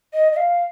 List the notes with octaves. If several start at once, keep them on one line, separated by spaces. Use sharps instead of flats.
D#5
D#5
F5